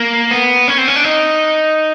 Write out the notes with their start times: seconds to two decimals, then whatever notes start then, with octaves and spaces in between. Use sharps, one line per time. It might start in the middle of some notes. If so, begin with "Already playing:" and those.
Already playing: A#3
0.31 B3
0.68 C#4
0.78 C4
0.88 C#4
0.95 D4
1.04 D#4